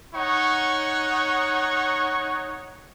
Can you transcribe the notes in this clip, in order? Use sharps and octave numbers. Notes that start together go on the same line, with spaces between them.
D#4 C#5 F#5 C#6